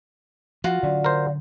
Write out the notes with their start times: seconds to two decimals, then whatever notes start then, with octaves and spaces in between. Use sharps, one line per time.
0.64 F3 F4 F#4
0.83 D3 F#3 C#4 D5
1.04 A#4 C5